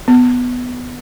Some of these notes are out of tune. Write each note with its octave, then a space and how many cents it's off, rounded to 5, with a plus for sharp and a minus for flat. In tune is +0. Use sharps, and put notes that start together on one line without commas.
B3 +5